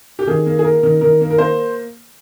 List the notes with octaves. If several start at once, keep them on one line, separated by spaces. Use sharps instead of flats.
G4
D#3 G#4
A#3
G#4
A#3 A#4
D#3
D#3 A#4
A#3
A#4
A#3 C5